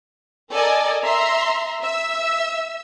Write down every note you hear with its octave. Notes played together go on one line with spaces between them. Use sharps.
A4 A#4 D5 D#5 G#5
E5 A#5 C6
E5 E6